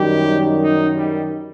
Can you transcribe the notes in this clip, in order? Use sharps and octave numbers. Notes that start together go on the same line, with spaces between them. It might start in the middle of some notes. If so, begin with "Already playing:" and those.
Already playing: F#2 D#3 G3 G4
D#4
G3